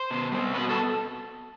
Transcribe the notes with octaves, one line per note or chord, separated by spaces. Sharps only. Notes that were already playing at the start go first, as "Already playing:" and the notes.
Already playing: C5
B2
G3 C4
B2 B4
A4